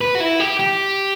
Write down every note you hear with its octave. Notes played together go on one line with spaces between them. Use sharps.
B4
F#4
E4
G4
G4